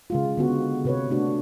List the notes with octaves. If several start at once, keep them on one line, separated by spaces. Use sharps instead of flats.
C#3 G#3 F4
D3 B3 F#4
C3 B4 C#5
A3 D4 F#4